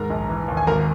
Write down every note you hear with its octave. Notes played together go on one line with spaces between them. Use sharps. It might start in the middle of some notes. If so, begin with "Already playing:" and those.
Already playing: D#2 G#2 A#4 A#5
A#1
E3
D#2
G#5
G#1 A#4 A#5